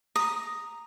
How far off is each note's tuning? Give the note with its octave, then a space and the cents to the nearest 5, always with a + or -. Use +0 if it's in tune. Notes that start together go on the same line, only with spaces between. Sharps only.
A#5 +0 D#6 +0